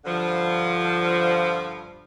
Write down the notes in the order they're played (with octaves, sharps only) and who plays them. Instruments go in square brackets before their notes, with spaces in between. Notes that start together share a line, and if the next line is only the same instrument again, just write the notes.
[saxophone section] G2 D3 F3